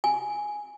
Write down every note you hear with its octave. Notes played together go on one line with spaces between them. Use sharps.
G#5